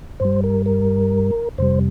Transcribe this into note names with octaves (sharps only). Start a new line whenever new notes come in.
G2 G3 C5
A#4
A#4
F2 C3 G3 C5